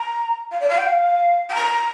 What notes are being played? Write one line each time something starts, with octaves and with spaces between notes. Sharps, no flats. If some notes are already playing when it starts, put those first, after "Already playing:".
Already playing: A#5
F5
D5
F5
G5
F5
G5
A#5